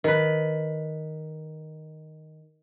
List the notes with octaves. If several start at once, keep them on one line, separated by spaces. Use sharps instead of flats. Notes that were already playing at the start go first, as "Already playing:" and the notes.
D#3 B4